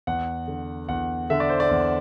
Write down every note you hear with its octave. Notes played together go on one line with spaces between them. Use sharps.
E2 F#5
D3
E2 F#5
D3 E5
D5
C5
D5
E2